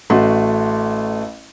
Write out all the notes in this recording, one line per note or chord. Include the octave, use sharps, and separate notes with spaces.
A1 A3 F#4 A5 C6